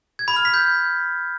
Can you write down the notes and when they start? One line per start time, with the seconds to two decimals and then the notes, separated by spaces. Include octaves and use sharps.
0.19 G#6
0.28 B5
0.36 F6
0.45 B6
0.54 G6